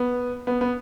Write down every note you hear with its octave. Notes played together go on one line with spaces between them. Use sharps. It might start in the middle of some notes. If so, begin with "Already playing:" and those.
Already playing: B3
B3
B3